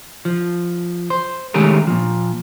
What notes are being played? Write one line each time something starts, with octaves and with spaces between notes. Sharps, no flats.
F3
C5
D#3 G#3 A3 C#4 G4 A#4
A#2 F3